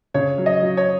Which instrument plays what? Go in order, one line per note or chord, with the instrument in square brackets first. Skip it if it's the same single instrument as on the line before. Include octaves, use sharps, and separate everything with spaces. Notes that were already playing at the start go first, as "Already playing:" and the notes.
[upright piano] C#3 C#5
F#3
D#5
F#3
C#5